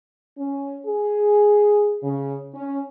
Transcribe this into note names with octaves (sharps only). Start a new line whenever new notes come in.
C#4
G#4
C#3
C#4